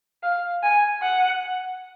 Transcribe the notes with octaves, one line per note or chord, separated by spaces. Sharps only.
F5
G#5
F#5